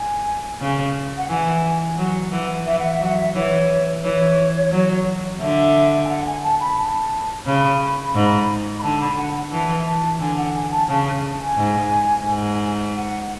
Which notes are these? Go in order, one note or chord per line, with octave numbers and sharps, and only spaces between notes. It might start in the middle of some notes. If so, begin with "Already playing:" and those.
Already playing: G#5
C#3
F#5
E3 G#5
F#3 F#5
E3
E3 E5
F#5
E5
F#3 F#5
E5
E3 C#5
E3 C#5
F#3
D3 E5
G#5
F#5
G#5
A5
B5
A5
C#3 B5
G#2
B5
D3 A5
B5
F#5
E3 A5
A5
D3 G#5
F#5
G#5
A5
C#3 A5
G#5
G#2
G#2
F#5